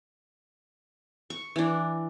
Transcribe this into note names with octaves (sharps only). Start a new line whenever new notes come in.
C#6
E3 D4